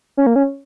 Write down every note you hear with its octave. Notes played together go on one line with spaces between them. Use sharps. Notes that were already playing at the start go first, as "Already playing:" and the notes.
C#4
A#3
C#4